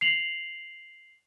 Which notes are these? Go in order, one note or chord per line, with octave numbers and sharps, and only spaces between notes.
C7 F7 F#7